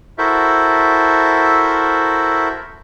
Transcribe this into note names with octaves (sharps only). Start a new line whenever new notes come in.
E4 F#4 A4 A#4 C5 E5